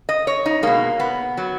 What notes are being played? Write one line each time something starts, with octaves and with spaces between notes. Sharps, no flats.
D#5
C#5
D#4
B2 G#3 A#3
B3
F#3